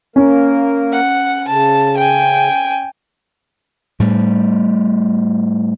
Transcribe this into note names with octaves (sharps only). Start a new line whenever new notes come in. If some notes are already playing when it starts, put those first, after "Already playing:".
A#3 C#4 A#4
F#5
C#3 A5
G5 G#5
A2 G3